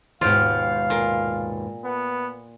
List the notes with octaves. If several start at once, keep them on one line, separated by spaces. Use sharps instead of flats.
D#2 G#2 B2 F4 G4 F5
A#2
B3